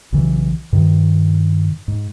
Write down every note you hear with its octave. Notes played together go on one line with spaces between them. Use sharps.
B1 C#3 E3
G2 C3 D#3
G#2